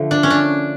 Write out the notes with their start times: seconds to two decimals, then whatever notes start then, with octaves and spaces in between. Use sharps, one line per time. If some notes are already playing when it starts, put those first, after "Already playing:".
Already playing: D3 F3 A3
0.11 D4
0.23 C#4
0.30 D4